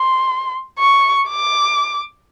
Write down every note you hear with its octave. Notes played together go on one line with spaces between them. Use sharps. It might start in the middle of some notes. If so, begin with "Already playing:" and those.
Already playing: C6
C#6
D6